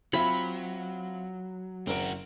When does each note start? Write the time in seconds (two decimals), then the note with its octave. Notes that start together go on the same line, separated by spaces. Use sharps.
0.13 F#3 C4 F4 E5 B5
1.87 F#1 C4 F#4 A#4 D7